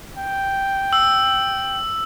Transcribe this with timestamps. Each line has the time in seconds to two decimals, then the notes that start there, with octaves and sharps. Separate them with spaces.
0.18 G5
0.93 E6